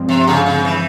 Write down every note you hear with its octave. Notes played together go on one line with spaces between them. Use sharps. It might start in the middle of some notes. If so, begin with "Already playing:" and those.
Already playing: G2 F3 G#3 C4
C3
C#3
C#3
E3